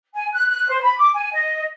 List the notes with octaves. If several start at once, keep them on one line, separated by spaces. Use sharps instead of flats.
G#5
F#6
F#6
C5
B5
D6
G#5
D#5